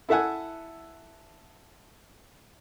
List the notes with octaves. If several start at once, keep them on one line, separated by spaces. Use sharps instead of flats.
E4 A4 E5 F#5 G#5